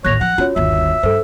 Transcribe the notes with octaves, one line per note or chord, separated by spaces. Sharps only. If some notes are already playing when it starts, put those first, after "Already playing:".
A1 D#2 C#5 F#6 A#6 F7
F3 F#5
C#4 F4 F#4 C#5
G1 D#2 E5
G2 A4 C5